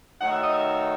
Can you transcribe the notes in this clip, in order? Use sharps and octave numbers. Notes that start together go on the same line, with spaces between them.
D#3 F#3 A3 D#4 F#5
E5
D#5
E5